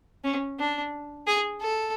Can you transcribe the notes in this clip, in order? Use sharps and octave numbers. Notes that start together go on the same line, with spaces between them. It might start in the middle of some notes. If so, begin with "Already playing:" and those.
C#4
D4
G#4
A4